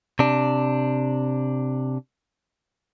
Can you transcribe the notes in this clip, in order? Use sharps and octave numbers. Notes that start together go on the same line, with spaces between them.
C3 D4